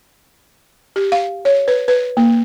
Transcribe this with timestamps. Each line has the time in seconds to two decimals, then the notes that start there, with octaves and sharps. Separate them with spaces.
0.96 G4
1.12 F5
1.45 C#5
1.68 B4
1.88 B4
2.17 A#3